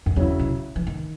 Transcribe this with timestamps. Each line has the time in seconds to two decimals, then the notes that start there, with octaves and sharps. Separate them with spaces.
0.06 F#2
0.16 E2 C#3 F#3 C#4 E4
0.39 B2
0.76 E3
0.87 D#3